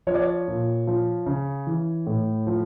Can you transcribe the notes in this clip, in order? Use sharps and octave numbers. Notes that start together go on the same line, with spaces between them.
F3 C#5
D5
C#5
A#2
F3
C#3
E3
A2
F3